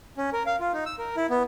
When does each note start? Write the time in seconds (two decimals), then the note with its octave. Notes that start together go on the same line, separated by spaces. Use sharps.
0.17 C#4
0.33 A#4
0.46 F5
0.60 F4
0.73 D#4
0.86 E6
0.99 A#4
1.17 E4
1.30 B3